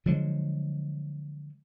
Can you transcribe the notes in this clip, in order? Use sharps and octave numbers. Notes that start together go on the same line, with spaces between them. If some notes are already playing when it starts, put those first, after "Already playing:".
D3 F3 F#3 G#3